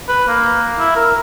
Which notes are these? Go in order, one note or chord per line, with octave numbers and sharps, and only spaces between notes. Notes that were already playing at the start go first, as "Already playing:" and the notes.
B4
A#3
E4
A#4